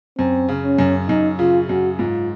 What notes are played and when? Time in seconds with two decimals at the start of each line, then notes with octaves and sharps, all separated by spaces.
0.18 F#2 C4
0.49 C#3
0.64 C#4
0.79 F#2
1.09 F#2 D#4
1.39 C#3 F4
1.69 F#2 F#4
1.99 G#2 F4